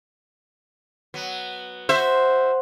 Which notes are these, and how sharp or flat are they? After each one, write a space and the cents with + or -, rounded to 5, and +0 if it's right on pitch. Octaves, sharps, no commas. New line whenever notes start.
F#3 +0 B3 +0
F#4 +0 C5 +0 E5 +0